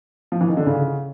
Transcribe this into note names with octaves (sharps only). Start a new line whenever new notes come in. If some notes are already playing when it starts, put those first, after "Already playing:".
F3
E3
D#3
D3
C#3